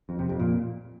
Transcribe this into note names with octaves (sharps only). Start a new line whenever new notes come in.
F2
C3
F2
A#2